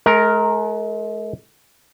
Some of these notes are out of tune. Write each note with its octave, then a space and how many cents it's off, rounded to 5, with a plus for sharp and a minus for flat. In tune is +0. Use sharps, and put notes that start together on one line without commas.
G#3 +45 A#4 +0